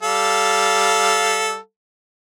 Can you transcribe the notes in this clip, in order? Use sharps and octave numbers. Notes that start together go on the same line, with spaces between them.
G3 A4 F5